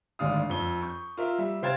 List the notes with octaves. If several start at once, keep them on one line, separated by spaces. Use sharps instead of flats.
G#1 D2 D4 F5 D#6
F2 G7
C#6 G6
F4 A#4 E5
G3 E5
C3 C5 F5 G5 G#6 A6